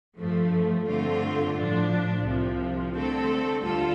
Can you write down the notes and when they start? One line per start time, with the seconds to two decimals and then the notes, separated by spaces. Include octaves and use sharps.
0.19 G2 F3 A3
0.88 G2 D3 A3 C4 F4
1.56 A2 F3 D4
2.25 C2 C3 F3
2.94 D3 A3 C4 A4
3.62 D2 D3 G3 F4 A4